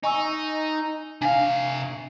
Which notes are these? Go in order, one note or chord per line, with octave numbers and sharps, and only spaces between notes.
D#4 G#5 C#6 E6
C3 D4 F5 G#5